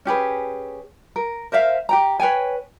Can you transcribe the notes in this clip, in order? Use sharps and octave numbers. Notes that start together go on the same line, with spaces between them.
C#4 G4 G#4 B4
A#4
A#4 C5 E5 F5
G4 G5 A#5
B4 C#5 G5 G#5